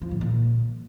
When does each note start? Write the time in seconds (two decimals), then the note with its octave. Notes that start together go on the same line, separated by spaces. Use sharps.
0.02 F3
0.11 G#2
0.21 A#2